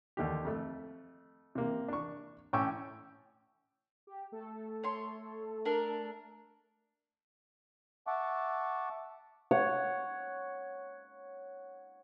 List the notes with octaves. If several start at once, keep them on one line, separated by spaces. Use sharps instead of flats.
D#2 D3 G4
F2 A3
C3 A#3
D4 C#6
A2 C#4 G5 C#6 D6 E6
G4
A3 A4
C#5 C6
D4 A#4
E5 F#5 A5 C#6 D6
C#5 F#5